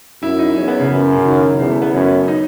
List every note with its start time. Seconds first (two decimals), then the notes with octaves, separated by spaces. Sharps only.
0.22 F#2 E4
0.39 D#4
0.56 E2 C#4
0.68 B3
0.79 C#3
0.91 F#2
1.15 C#3
1.25 D#3
1.59 E2 C#3
1.71 A3
1.82 B3
1.93 F#2 C#4
2.28 D#4